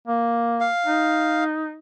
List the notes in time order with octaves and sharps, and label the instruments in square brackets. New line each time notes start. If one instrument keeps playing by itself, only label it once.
[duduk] A#3
[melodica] F5
[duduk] D#4